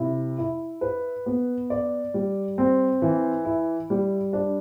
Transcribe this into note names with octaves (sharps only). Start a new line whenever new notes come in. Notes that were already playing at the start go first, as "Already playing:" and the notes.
Already playing: C3 E4
E4
B4
B3
D5
G3
C4
E3
E4
G3
D4